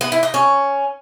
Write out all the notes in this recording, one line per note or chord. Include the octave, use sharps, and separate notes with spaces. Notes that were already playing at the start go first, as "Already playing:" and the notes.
B3
E4
D#4
C#4